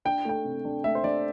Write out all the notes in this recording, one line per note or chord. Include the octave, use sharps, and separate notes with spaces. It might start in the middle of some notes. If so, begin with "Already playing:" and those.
D4 G5
A3 G5
C3
D4
A3 E5
C5
D4 D5